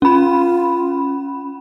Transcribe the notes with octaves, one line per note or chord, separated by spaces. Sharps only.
C#4 F4 B5